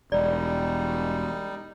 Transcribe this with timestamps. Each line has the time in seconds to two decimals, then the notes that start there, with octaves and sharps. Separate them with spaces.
0.12 E1 G3 D#4 D5